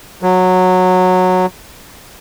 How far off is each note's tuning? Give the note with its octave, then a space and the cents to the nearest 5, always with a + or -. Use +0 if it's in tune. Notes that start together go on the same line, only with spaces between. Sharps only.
F#3 -10